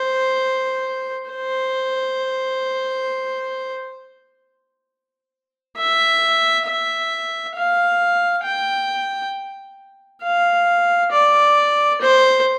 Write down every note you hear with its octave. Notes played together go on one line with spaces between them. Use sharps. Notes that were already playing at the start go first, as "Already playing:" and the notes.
Already playing: C5
C5
E5
E5
F5
G5
F5
D5
C5